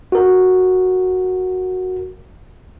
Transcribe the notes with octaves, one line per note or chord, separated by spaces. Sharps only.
F#4 A#4